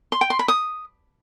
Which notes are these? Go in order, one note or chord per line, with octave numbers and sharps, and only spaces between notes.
C6
G5
C6
B5
D#6